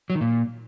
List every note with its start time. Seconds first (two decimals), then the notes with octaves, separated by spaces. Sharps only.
0.10 F#3
0.15 D#3
0.21 A#2